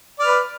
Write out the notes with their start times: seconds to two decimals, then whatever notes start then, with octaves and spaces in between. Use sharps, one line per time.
0.19 D5
0.22 F6
0.25 B4